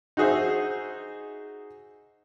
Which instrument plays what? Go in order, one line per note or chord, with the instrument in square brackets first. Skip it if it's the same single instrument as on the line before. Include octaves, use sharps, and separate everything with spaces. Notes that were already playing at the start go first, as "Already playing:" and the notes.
[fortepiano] D#4 F#4 G#4 C5 E5